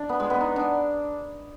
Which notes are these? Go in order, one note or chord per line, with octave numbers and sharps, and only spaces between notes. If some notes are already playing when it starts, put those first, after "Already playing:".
Already playing: D4
B3
G#3
B3
D#4
D4